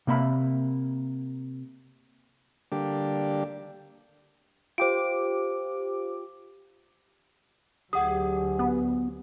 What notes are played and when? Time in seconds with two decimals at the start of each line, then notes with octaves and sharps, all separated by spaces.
0.07 C3 A#3 E5 B5
2.72 D3 G3 A#3 D4 G4
4.78 F4 G4 C5 D6 D7
7.93 D2 F#3 G4 G#4 F#5 D#6
8.59 B3